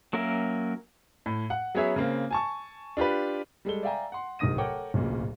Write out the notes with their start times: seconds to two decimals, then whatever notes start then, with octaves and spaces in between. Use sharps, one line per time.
0.13 F#3 A#3 C#4 A#4 E5
1.26 A2
1.50 F#5
1.75 F#3 B3 C#4 G#4 C#5 E5
1.96 C#3 A#3 C4
2.31 G#5 A5 C#6
2.97 D4 F4 G4 B4
3.65 G3 G#3 A4 G7
3.83 D5 E5 F5 G5 G#5 A#5
4.12 F#5 C6
4.39 D1 C2 D#3 D#6 A#6 D#7
4.58 A4 A#4 C#5 F#5 G5 D6
4.94 D1 B1 A#2 C#3